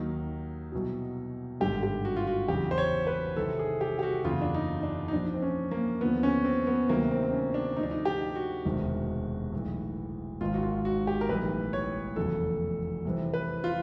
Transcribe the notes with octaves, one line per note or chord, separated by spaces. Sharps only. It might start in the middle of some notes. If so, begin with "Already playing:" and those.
Already playing: D#2 D#3 F#3 D#4
C2 B2 F#3
G#1 G2 D3 G3 G4
G4
F#4
F4
F#4
E2 C#3 F#3 G4
C5
C#5
B4
C2 C3 D#3 G3 A4
G#4
G4
G4
F#4
F#1 E2 C#3 F#3 F4
D4
D#4
D4
D#4
A#1 A#2 F3 D4
C4
C#4
A#3
D#2 D3 F3 B3
C#4
C4
B3
D2 C3 D#3 F#3 A#3
C4
C4
C#4
D4
D2 D3 F3 D#4
D4
D#4
G4
F#4
E1 D2 C3 D#3
B1 A2 E3
G#1 G#2 D#3 F4
F#4
F4
F#4
G4
A#4
B1 A2 E3 G3 B4
C#5
F1 E2 C#3 F#3 A4
C2 C3 E3
B4
F4